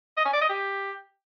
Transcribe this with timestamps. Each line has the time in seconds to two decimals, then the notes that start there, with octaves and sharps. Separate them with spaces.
0.17 D#5
0.25 C#4
0.33 D5
0.41 D#5
0.49 G4